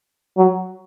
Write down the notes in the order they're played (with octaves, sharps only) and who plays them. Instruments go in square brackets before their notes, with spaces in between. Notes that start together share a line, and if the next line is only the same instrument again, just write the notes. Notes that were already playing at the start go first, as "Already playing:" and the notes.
[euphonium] F#3